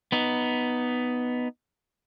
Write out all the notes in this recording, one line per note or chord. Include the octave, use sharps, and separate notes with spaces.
B3 D#4